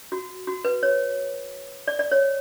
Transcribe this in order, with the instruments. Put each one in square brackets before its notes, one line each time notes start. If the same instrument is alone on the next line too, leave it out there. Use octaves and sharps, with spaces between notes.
[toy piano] F#4
F#4
B4
C#5
D5
D5
C#5